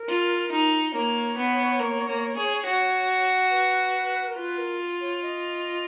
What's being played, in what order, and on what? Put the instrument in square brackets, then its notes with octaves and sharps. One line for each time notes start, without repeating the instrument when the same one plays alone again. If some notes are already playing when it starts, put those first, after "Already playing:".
Already playing: [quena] A#4
[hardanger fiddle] F4
D#4
[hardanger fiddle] A#3 [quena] C#5
[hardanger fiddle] B3
A#3
A#3
G#4
F#4
[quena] B4
A#4
[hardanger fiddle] F4 [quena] B4
[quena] A#4
C#5
D#5